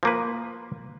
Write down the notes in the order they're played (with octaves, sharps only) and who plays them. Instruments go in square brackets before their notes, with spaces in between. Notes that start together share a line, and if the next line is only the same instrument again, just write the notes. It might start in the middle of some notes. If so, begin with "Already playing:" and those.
[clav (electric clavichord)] F3 A#3 B4